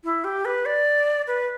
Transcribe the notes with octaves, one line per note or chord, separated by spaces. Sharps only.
E4
G4
B4
D5
B4